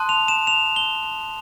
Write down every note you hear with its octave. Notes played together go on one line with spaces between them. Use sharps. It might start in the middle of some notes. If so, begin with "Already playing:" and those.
Already playing: A5 C6 D#6 F#6
F7
E7
F7
G7